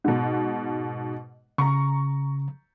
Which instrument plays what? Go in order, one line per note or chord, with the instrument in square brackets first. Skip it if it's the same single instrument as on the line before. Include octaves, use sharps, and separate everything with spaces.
[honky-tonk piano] G#2 B2
[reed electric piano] C#3 [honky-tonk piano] A#5 C#6